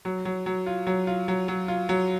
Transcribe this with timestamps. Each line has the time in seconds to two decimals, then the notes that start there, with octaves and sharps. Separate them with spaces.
0.05 F#3
0.25 F#3
0.46 F#3
0.66 F4
0.87 F#3
1.07 F4
1.28 F#3
1.48 F#3
1.68 F4
1.89 F#3